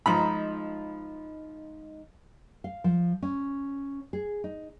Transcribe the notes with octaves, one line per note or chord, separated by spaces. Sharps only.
F3 G#3 D#4 A#5 B5
F5
F3
C#4
G#4
D#4